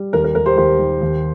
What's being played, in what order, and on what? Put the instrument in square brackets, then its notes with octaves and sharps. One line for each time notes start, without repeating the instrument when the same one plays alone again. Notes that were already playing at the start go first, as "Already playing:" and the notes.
Already playing: [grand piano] G3
D#2 A#4
A#4
D#2 A#4
G4 C5
D#2 G4 C5
D#3
D#2